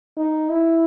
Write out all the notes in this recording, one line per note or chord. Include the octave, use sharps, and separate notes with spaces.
D#4
E4